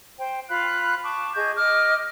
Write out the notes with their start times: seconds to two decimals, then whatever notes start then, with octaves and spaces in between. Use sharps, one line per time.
0.19 C5 G5
0.49 F4 F5 B5 F#6
1.03 A5 C#6 D6
1.35 G#4 D#5 C#6 G6
1.57 D#5 D6 F6